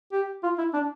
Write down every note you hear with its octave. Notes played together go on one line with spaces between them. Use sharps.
G4
F4
E4
D4